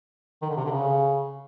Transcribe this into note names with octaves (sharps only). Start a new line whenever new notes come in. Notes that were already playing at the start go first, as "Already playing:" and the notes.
D#3
D3
C3
D3
C#3